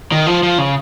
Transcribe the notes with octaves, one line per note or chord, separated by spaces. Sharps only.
D#3
F3
F3
C#3